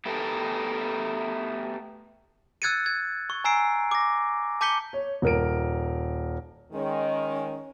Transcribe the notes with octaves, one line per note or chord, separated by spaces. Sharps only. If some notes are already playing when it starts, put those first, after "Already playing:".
A3 B3 G4 A4 A#4
E6 F#6 G#6 A6 C#7 D#7
G#6
C#6
G#5 A#5 E6 C7 D7
D6 A#6
A5 D6 G6 B6 C#7 G7
C#5
D#1 A#4 D7
D#3 G#3 C#4